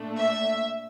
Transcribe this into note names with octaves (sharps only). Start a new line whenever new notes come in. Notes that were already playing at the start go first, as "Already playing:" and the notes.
Already playing: A#2 A3 D4
E5